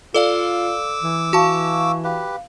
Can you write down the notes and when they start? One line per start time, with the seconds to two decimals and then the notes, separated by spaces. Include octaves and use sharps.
0.14 F4 A4 D5 F5 D6 E6
1.03 E3
1.33 F#4 F5 A5 C#6
2.04 G4 B4 F5